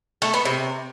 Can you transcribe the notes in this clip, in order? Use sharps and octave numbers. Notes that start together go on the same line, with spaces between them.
A3
B3
C3